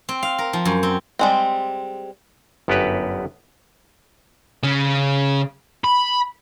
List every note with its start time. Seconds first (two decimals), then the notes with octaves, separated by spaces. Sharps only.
0.09 C4
0.23 F5
0.38 A#4
0.53 F3
0.65 F#2
0.83 C4
1.19 G3 G#3 C4
2.68 G1 F#2 B3 F#4 G4 B4
4.63 C#3
5.84 B5